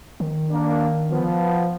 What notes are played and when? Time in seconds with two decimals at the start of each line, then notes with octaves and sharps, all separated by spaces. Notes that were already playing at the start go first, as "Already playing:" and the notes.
0.20 D#3
0.50 A#3 D4
1.10 F3 B3